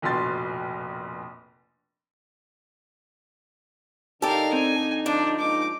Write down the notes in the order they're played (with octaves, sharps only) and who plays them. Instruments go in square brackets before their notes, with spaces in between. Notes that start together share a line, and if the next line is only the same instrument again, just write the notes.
[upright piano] F1 A#1 B2 C6 A6
[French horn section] D3 D#4 [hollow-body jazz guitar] G4 G5 [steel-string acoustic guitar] A4 D5 [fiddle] A#4 F5
[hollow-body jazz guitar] C4 [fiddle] G#5
[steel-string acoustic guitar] F3 [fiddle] D4
[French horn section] G#3 A#3 D#4 [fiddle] D6